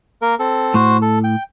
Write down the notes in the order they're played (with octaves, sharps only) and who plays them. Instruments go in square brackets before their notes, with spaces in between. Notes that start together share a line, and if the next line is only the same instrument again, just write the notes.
[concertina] A#3 A#4
C4 A4
[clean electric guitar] A2 [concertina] F#4 C5
[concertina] A4
G5